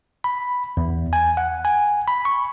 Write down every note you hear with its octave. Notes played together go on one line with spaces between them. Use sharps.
B5
E2
G#5
F#5
G#5
B5
C#6